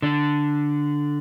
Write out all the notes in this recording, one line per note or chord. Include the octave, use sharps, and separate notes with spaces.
D3 D4